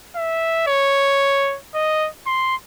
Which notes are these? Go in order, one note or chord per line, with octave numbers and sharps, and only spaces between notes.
E5
C#5
D#5
C6